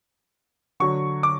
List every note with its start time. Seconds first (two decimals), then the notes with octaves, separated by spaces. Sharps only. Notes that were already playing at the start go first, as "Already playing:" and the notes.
0.80 D3 F#3 C#6
1.23 D6